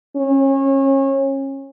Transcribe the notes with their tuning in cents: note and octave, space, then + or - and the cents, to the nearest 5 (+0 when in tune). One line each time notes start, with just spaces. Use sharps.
C#4 -30